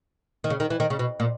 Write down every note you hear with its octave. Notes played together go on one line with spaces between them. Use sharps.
D#3
C#3
D#3
E3
D#3
C#3
B2
A#2